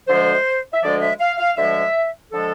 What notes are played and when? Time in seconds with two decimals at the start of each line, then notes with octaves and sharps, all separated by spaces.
0.08 D2 D3 F3 G#3 C5
0.73 E5
0.83 D2 D3 F3 G#3 D5
1.01 E5
1.20 F5
1.38 F5
1.57 D2 D3 F3 G#3 E5
2.32 D3 F3 G#3 A4